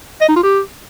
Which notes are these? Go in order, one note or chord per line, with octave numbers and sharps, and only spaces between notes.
D#5
D#4
F4
G4